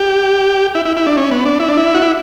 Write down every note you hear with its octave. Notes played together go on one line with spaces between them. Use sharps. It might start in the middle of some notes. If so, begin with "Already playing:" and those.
Already playing: G4
E4
E4
E4
D4
C#4
B3
D4
E4
D4
E4
F#4
E4